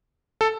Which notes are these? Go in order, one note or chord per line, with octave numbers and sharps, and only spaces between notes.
A4